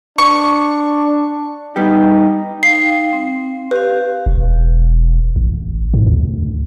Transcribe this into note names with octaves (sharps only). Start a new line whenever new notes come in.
D4 C#6
G3 B3 D#4 G4
D#4 F5 G5 C7
C4
G4 B4 F5
E1
A1
G#2
D2